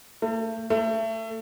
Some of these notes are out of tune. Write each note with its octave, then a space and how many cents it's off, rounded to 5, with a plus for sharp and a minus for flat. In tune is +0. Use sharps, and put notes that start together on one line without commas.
A3 +35
A3 +25